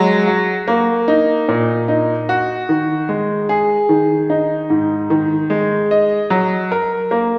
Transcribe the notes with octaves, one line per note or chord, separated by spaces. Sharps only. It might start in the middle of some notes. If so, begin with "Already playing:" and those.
Already playing: F#3 G#3
F#4
A#3
D#4
A#2
D#4
F#4
D#3
G#3
G#4
D#3
D#4
G#2
D#3
G#3
D#5
F#3
A#4
A#3